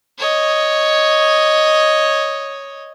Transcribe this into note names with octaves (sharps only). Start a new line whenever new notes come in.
C#5 D#5